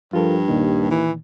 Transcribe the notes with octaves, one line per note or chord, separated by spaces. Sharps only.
G2 F3 F4 A4 A#4
D#2 A#2 D#3
E3